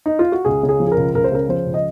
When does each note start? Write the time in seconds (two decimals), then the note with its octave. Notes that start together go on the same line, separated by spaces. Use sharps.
0.06 D#4
0.19 F4
0.32 F#4
0.45 C#2 G#4
0.63 C#3
0.69 G#4
0.80 F3
0.87 G#4
0.92 A#4
0.97 C#2
1.15 C#2 A#4
1.24 C5
1.32 C#3 A#4
1.49 F3 C5
1.66 C#2
1.74 D#5